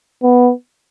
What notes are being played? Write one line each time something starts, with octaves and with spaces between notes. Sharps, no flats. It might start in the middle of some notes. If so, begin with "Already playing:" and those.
B3